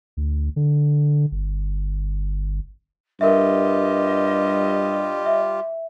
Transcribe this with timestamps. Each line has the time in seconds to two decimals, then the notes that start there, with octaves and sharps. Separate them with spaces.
0.17 D2
0.56 D3
1.32 G1
3.21 G2 G3 F4 G4 A#4 D#5 E5
5.26 E5